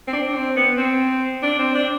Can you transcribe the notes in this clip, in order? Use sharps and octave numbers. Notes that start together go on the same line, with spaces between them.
C4
D4
D4
C4
B3
C4
D4
C4
D4